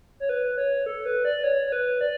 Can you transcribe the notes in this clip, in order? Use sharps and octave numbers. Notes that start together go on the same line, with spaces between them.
C#5
B4
C#5
A4
B4
D5
C#5
C#5
B4
D5